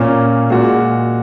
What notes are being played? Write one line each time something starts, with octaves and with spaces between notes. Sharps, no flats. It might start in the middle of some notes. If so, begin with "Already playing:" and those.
Already playing: A#2 A#3 C#4
A#2 G#3 F#4